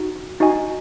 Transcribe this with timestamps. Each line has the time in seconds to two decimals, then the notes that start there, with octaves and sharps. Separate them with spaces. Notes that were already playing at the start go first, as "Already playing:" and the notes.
Already playing: D#4 F#4
0.40 D#4 F#4 D#5 G#5